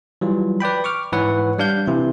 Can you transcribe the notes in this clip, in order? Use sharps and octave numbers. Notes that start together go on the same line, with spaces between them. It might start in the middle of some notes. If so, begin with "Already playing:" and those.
E3 F#3 G3 F4
B4 D5 G5 B5
C#6 D6 F6
G#2 E3 B4 C#5 F#5
G3 D4 F5 G6
C3 E3 E4